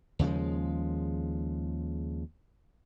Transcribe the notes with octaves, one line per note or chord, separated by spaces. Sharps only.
D#2 C#3 F3 G#3